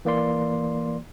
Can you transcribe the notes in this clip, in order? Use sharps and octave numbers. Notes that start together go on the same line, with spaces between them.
E3 A#3 D5 C6